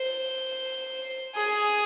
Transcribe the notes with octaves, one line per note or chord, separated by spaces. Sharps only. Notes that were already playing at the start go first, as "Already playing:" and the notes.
Already playing: C5
G#4